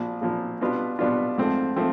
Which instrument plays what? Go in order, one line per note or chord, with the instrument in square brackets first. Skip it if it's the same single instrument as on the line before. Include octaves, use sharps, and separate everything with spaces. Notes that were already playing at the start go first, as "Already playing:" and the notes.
Already playing: [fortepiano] A#1 A#2 F3
A#1 A#2 F3
B2 G3 B3 D4 F4
B2 G3 B3 D4 F4
G#2 F3 A3 C4
F3 A3 C4